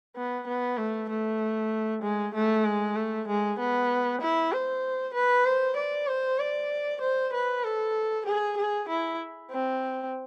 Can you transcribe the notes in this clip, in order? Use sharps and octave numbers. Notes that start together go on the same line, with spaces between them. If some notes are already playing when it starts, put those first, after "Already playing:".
B3
B3
A3
A3
G#3
A3
G#3
A3
G#3
B3
E4
C5
B4
C5
D5
C5
D5
C5
B4
A4
G#4
G#4
E4
C4